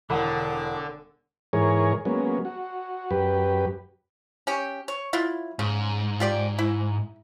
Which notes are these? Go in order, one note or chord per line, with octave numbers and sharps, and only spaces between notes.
E1 D3 F#5 B5 D6
G#2 E3 G#4 A#4 C#5
F#3 G#3 A#3 B3 C#4
F#4
F#2 G4 B4
C#4 G4
C#5
F#3 E4 F4
G#2 C#3
F4 G4 D5
E4